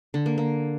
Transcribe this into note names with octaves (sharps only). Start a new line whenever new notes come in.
D3
A#3
A#3